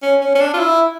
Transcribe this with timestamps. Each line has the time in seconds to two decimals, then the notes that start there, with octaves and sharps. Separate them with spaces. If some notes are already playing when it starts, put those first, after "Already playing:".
0.02 C#4
0.21 C#4
0.35 C#4
0.40 D4
0.54 F4
0.60 E4